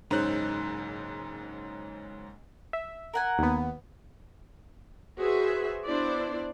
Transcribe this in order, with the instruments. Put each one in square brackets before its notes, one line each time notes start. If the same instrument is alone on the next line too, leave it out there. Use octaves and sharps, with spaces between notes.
[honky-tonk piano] F#1 G#2 C#4 D#4 C5 F#6
[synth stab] E5
[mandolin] A#4 F#5 G#5
[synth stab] D#2 B3
[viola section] F#4 G#4 B4 C5 E5
B3 D4 E4 C5 D5